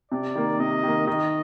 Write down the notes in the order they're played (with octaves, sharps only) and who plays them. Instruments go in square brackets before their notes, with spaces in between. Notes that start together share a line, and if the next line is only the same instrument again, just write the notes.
[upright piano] C3 [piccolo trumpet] D5
[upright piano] D#3 A#3
[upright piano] C3 [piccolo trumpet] D#5
[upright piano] D#3 A#3
[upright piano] D#3 [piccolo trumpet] D#5